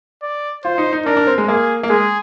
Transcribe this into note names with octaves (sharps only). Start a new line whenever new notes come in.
D5
F4 C5
D#4
D#4
D4 A#4
D4
C4
G#3
A#3 G#4
A#3
G#3 G#4